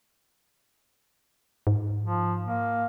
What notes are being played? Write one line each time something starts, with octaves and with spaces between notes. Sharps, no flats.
G#2
F3
A#3